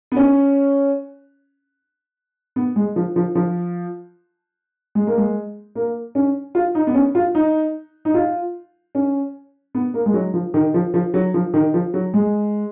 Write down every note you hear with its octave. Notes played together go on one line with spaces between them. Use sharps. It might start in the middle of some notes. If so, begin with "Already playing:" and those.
B3
C#4
B3
G#3
F3
F3
F3
G#3
A#3
G#3
A#3
C#4
F4
D#4
B3
C#4
F4
D#4
D#4
F4
C#4
B3
A#3
G#3
F#3
F3
D#3
F3
F3
F#3
F3
D#3
F3
F#3
G#3